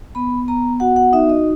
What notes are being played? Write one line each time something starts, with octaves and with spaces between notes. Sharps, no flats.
B3 B5
B3 A#5
F#4 F#5
F#5
D#4 E5
D#5